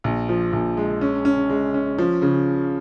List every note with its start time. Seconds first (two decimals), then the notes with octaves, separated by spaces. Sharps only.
0.04 A#1
0.29 F3
0.53 A#1
0.77 G#3
1.01 C#4
1.25 C#4
1.50 G#3
1.74 C#4
1.98 F3
2.22 C#3